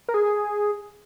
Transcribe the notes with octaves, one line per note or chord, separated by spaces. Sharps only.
A#4
G#4